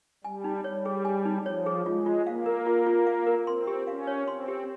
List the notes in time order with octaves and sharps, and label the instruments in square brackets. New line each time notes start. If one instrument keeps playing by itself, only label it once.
[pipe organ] G3 [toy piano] G#5
[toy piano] D#4
[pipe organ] G3 [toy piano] C#5
[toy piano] G#4
G#5
D#4
[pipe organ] F3 [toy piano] C#5
[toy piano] G#4
[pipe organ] G#3 [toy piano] F4
[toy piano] F4
[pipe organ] A#3 [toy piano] F5
[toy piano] A#4
F4
F4
F5
A#4
[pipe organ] C4 [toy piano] C6
[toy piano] G4
[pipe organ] C#4 [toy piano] F5
[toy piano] C#5
[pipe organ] C4 [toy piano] C6
[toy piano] G4